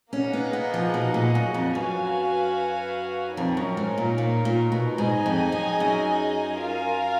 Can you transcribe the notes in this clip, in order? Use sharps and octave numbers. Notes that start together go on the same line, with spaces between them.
A#3 C#4 D#4 G#4 D#5 F#5
B3
B3
F3
B2
A#2
F#2
F2
F#2 F#4 B4 F5 G#5
F2 D#4 A#4 C#5
F#2
G#2
A#2
A#2
A#2
B2
G#2 D#4 G#4 D#5 G#5
F2
F#2
F#2
F4 A#4 F5 G#5